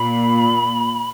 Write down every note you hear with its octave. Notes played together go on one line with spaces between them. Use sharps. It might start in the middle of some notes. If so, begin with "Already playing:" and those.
Already playing: A#2 B5